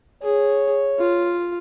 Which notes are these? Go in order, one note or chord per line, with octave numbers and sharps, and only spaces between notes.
G#4 C#5
F4